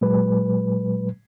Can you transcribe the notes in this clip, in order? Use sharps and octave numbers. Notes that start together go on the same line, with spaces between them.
A#2 F#3 G#3 B4